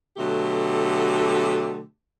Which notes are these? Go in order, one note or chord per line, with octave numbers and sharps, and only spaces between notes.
B2 D3 F#3 A3 G4 A4